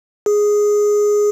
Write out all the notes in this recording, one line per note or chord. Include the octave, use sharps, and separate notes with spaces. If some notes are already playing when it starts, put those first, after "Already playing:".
G#4